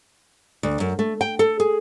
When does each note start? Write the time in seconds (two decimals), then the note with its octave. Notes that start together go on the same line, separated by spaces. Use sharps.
0.63 D2
0.80 F#2
0.99 A3
1.21 G5
1.39 A4
1.60 G#4